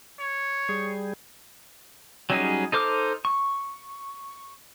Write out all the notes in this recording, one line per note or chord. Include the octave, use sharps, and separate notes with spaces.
C#5
G3 G#4
F#3 G3 C#4 D#4 G#4
D#4 A4 C5 D6 F6
C#6